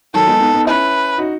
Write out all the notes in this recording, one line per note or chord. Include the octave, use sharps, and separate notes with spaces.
D#3 F#3 A4
G#3 B3
B3 D#4
B3 D#4
C#4 E4 B4
D#4 F#4